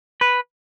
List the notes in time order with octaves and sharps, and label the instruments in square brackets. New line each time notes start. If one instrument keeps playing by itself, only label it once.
[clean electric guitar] B4